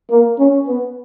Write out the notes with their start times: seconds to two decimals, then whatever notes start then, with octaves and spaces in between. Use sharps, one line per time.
0.10 A#3
0.39 C#4
0.67 B3